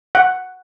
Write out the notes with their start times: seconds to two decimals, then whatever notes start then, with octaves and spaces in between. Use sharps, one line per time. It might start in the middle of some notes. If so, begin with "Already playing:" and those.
0.15 F#5